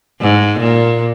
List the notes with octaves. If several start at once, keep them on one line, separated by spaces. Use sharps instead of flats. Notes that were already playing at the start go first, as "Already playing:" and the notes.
G#2
A#2